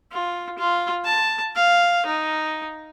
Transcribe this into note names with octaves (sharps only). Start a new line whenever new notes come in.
F4
F4
A5
F5
D#4